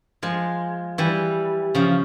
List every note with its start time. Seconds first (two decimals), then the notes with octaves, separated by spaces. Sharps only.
0.22 F3 G#3
0.98 E3 G3
1.75 C#3 F3